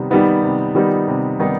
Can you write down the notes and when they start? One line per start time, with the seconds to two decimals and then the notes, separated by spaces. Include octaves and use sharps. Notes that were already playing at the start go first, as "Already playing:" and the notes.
Already playing: C3 D#3 G3 B3 D#4
0.11 D#3 G3 B3 D#4
0.42 C3
0.75 D#3 G3 B3 D#4
1.07 C3
1.39 D#3 G3 B3 D#4